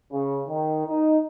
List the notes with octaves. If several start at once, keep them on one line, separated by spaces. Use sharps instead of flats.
C#3
D#3
D#4